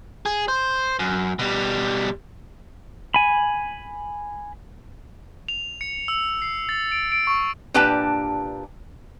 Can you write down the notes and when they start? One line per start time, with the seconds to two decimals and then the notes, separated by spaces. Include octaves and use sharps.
0.26 G#4
0.48 C5
0.99 F#2
1.39 B2 G3
3.14 G#5 B5
5.48 F7
5.81 C#7
6.08 E6
6.42 C7
6.69 A6
6.92 D7
7.12 D7
7.27 C#6
7.74 A#2 D4 G4 B4 G5 A5